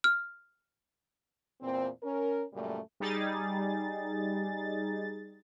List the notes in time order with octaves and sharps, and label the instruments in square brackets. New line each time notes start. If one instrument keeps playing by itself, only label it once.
[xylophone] F6
[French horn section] E2 A#2 C4
C#4 A#4
F#2 A#2 C#3 G3 A3
[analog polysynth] G3 D#4 G#4 A6